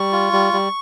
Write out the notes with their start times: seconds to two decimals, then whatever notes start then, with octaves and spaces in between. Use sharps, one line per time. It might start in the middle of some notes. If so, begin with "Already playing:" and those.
Already playing: G3 C#6
0.12 F4
0.33 G3
0.53 G3